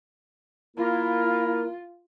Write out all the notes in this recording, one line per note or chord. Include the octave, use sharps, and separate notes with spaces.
A#3 E4 F4 A#4